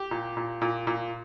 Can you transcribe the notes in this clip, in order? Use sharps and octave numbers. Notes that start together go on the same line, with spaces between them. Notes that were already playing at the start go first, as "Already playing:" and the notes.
Already playing: G4
A#2
A#2
A#2
A#2